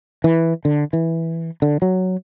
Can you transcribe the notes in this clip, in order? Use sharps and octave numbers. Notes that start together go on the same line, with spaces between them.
E3
D3
E3
D3
F#3